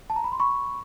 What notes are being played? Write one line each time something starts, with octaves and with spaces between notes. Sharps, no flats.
A5
A#5
B5
C6
B5 C#6